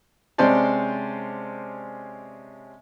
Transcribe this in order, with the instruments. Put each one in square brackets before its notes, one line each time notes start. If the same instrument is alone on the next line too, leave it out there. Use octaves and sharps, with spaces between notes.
[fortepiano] C3 G#3 C#4 C5 D5 A5